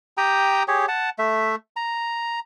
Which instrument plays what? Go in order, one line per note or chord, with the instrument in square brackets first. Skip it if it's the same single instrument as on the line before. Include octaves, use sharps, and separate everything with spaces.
[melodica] G4 G5 A#5 D#6
G4 G#4 C#5
F#5 A5
A3 E5
A#5